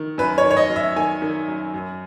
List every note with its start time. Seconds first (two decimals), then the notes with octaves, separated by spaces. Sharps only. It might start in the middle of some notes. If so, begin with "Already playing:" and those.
Already playing: D#3
0.18 F#2 B4
0.38 C#5
0.45 D#3
0.51 C#5
0.57 D#5
0.69 F#2
0.76 E5
0.96 D#3 G#5
1.22 D#3
1.48 F#2
1.74 F#2